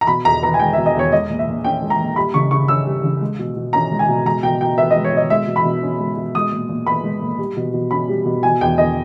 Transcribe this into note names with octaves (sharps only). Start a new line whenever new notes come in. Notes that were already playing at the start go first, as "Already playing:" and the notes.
A#5
B2 B5
E2 A#5
B3 A#5
G#5
G#3 G5
E5
B2
D#5
E2 C#5
G#3 D#5
A#2
E5
A#2
C#4 G5
G#3
A#5
A#2
G3 B5
C#3 C#6
C#3 C#6
C#4 E6
G3
C#3
G#3
B2
B2
C#4 A#5
G#3
G#5
B2
G#3 A#5
B2 G5
B2 G5
B3 E5
D#5
G#3
C#5
B2 D#5
G#3 E5
B2
B5
B2
C#4
G#3
B2
G#3 D#6
A#2
A#2
B3 B5
G#3
A#2
G3
B2
B2
C#4 B5
G3
B2
B2 G#5
E2 G5
E2 D#5